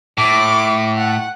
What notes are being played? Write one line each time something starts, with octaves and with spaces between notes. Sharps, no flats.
A2 D6
F#5